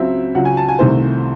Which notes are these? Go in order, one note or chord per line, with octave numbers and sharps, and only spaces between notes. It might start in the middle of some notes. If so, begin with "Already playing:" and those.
Already playing: C#2 C#3 F#3 C4 E5
C#2 C#3 F#3 F#5
G#5
A5
G#5
C2 C3 D#3 A3 C5